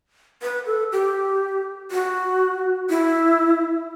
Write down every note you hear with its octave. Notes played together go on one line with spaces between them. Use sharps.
B4
A4
G4
F#4
E4